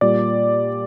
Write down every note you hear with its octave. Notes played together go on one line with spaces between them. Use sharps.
A#2 G3 D5